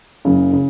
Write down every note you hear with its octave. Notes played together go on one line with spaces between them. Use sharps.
F#1 F#2 C#3
C#3